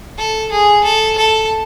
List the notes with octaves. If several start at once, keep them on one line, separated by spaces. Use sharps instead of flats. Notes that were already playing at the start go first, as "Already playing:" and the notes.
A4
G#4
A4
A4